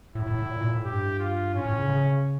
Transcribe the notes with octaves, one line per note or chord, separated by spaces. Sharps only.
A2 E4
A2
A2
A#2
A#2
A2
G2 G4
F4
A2 C#4
A2
C#3
C#3